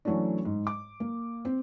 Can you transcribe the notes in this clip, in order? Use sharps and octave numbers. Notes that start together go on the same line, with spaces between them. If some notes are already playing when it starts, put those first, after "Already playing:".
E3 F#3 A3 C#4 D4
G#2
D6
A#3
C4